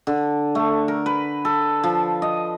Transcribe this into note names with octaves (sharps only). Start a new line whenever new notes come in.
D3
A3
A#4
B4
A4
F3
D#5